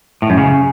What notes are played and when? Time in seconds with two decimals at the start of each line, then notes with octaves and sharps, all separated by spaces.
0.22 A2
0.30 F#2
0.37 C#3